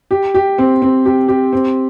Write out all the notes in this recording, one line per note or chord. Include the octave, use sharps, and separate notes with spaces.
G4
G4
C4
C4
G4
G4
C4